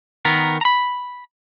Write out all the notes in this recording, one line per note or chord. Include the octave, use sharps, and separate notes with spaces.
D#3 B3 A#4
A#5 B5